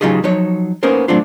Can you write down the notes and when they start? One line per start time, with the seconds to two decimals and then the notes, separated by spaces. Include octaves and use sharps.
0.01 C#3 F#3 D#4 F4 G4 G#4
0.24 F3 F#3 D#4 C#5
0.83 A#3 B3 C#4 D#4 A#4 C5
1.08 F#3 A3 C4 D4 F4